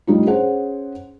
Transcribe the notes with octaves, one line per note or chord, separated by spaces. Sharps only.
A2 G3 D#4 F4
C#4 G#4 C5 F#5